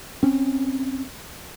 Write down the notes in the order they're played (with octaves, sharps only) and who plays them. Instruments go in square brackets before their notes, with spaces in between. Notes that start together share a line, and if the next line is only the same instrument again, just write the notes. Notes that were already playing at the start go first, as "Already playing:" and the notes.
[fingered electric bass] C4 C#4